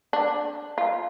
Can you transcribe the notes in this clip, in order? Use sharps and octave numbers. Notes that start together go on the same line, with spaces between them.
D4
F4